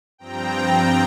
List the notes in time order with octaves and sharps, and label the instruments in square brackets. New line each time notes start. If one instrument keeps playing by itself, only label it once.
[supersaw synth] G2 F3 C4 G5 A#5